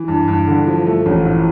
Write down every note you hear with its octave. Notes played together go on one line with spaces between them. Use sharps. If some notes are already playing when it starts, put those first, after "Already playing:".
Already playing: E3
G2
G2
D3
F3
A3
A1
A2